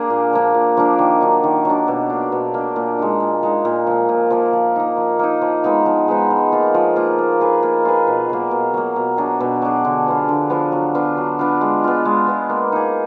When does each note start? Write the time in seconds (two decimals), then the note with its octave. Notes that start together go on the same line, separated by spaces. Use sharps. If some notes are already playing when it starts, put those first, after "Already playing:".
Already playing: A#3 D4 G#4
0.10 A#2
0.33 F3 A#3 D4
0.54 A#2
0.77 F3 A#3 D4
0.99 D#3
1.21 F#3 D4
1.44 D#3
1.65 F#3 D4
1.88 B2
2.10 A#3 D4
2.32 B2
2.54 A#3 D4
2.76 A#2
2.99 G#3 D#4
3.20 A#2
3.43 G#3 D#4
3.65 A#2
3.87 F3 A#3
4.09 A#2
4.30 F3 A#3
4.53 F3
4.76 A#3 D#4
4.97 F3
5.19 A#3 D#4
5.42 F3
5.64 G#3 B3 D#4
5.86 F3
6.08 G#3 B3 D#4
6.30 F3
6.52 A#3 F4
6.74 F3
6.96 A#3 F4
7.19 A#3
7.40 F4 G#4 B4
7.63 A#3
7.85 F4 G#4 B4
8.07 B2
8.29 F#3 A#3
8.51 B2
8.74 F#3 A#3
8.96 B2
9.17 F#3 D4 G#4
9.41 B2
9.62 F#3 D4 G#4
9.85 D3
10.06 F3 B3 F4
10.29 D3
10.50 F3 B3 F4
10.72 F#3
10.95 B3 D4 F4
11.17 F#3
11.39 B3 D4 F4
11.61 G#3
11.84 B3 F4
12.05 G#3
12.27 B3 F4
12.49 A#3
12.72 D#4 G#4